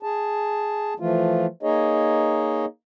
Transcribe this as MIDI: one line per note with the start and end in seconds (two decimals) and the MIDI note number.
0.03 0.94 68
0.03 0.94 81
1.00 1.46 52
1.00 1.46 53
1.00 1.46 57
1.00 1.46 65
1.63 2.65 58
1.63 2.65 63
1.63 2.65 68
1.63 2.65 73
1.63 2.65 75